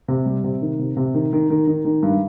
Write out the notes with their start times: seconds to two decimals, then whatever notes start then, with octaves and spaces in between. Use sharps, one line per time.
0.08 C3
0.26 G3
0.44 C3
0.62 D#3
0.79 C3
0.97 C3
1.14 D#3
1.33 D#3
1.50 D#3
1.67 D#3
1.85 D#3
2.03 G2